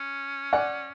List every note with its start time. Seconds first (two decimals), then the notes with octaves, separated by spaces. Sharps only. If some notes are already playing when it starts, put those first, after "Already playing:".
Already playing: C#4
0.53 D5 F#5